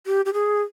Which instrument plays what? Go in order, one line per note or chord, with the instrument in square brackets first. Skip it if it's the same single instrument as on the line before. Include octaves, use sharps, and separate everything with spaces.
[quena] G4
G4
G#4